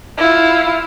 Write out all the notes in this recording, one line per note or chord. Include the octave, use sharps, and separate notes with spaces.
E4 F4